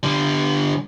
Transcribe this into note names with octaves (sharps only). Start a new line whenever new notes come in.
D3 G3